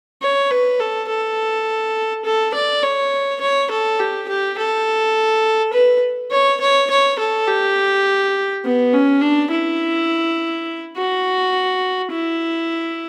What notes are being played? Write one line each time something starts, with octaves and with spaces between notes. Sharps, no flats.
C#5
B4
A4
A4
A4
D5
C#5
C#5
A4
G4
G4
A4
B4
C#5
C#5
C#5
A4
G4
B3
C#4
D4
E4
F#4
E4